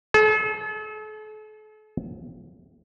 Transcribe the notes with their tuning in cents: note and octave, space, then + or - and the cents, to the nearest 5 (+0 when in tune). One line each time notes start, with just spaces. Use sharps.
A4 -40